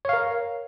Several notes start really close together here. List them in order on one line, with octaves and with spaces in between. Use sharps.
C#5 F5 A#4